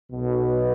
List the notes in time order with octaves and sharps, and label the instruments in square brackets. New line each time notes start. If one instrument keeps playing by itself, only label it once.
[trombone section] B1 B2